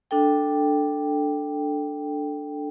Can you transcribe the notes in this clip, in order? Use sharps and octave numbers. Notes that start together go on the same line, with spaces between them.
D4 A4 G5